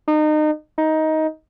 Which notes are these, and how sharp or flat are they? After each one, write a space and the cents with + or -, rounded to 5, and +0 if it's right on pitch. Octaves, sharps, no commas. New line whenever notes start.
D#4 -30
D#4 +15